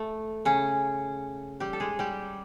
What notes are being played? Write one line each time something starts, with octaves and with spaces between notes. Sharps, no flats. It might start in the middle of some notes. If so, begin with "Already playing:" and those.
Already playing: A3
C#3 C#4
G3 G4
A4
G#3 G#4
G3 G4